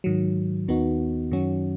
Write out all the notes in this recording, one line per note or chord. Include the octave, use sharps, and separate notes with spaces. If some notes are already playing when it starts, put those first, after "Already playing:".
G#2 D#3 F#3
D#2 D#3 B3 D#4 F#4
F#2 D#3 F#3 C#4 F#4